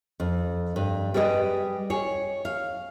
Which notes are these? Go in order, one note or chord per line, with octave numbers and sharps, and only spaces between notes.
F2
G2
G3 G#4 B4 C#5 D#5
G#4 C#5
F5